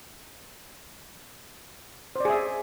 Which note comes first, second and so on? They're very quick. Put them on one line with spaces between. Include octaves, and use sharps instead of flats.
C5 D5 G#4 E5